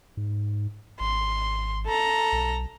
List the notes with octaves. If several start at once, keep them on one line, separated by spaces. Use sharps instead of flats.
G#2
G#1 C6
A4 A#5
B1